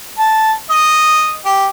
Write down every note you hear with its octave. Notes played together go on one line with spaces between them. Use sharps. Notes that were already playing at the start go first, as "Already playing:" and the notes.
A5
D#5
G4